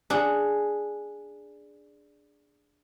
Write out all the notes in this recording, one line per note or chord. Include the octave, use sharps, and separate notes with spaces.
D4 G#4 F#5